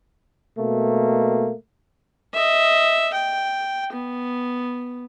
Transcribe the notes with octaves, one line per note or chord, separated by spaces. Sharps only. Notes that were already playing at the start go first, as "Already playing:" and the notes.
B2 A3 A#3
D#5 E5
G5
B3